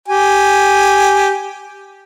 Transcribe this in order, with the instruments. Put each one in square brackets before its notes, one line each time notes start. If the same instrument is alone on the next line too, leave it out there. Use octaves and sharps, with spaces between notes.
[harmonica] G4 G#5